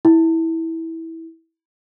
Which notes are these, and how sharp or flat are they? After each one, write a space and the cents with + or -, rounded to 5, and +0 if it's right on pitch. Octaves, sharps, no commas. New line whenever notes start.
E4 -15